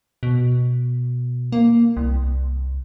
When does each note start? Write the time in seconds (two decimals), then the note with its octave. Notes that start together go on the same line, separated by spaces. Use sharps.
0.23 B2
1.52 A#3
1.97 C2